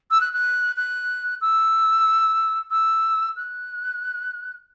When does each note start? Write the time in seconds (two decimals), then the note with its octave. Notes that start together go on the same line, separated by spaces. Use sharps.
0.11 E6
0.21 F#6
0.33 F#6
0.76 F#6
1.41 E6
2.71 E6
3.37 F#6